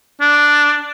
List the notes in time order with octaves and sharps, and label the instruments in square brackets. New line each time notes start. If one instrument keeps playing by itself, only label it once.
[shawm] D4